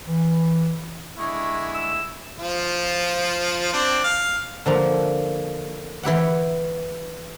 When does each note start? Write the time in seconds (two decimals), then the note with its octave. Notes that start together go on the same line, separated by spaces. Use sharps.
0.07 E3
1.17 D3 G#3 E4 C#6
1.74 E6
2.38 F3 F4
3.73 C4 D4
4.04 F5
4.66 D3 F3 A#3
6.03 E3 E4 G4 F#5